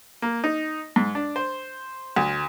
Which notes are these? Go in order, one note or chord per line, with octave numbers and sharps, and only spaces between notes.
A#3
D#4
G#2
D4
C5
D2